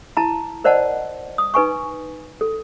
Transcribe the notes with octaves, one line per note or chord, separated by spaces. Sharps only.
E4 A5 A#5
A#4 C5 D5 D#5 F#5 A5
D#6
D#4 B4 G#5 C#6
A4